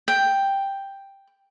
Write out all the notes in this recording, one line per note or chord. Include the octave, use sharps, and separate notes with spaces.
G5